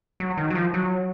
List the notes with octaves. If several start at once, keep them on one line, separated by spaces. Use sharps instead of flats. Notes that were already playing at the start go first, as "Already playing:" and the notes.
F#3
D#3
F#3
F3
F#3